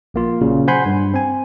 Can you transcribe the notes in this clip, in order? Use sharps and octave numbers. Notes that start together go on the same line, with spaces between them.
A#1 A#3 F4
A#2 C#3 F#3
C5 F#5 G#5 B5 C6 G6
G2
C4 G#5